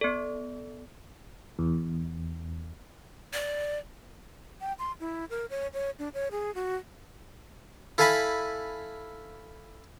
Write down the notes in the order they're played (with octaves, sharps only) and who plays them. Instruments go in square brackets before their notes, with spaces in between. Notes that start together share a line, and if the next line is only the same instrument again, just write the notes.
[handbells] B3 A4 [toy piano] D5
[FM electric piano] E2
[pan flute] D5
[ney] G5
C6
E4
A#4
C#5
C#5
D4
C#5
G#4
F#4
[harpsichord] E4 A4 F5 G#5 A5 B5